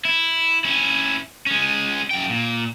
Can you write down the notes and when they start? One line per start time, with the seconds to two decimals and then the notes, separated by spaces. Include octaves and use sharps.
0.05 E4
0.65 C#4 E4
1.46 G#3 C#4
2.11 F#2 G5
2.30 A#2